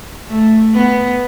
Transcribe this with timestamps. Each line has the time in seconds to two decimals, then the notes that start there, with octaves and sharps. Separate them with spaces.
0.28 A3
0.74 B3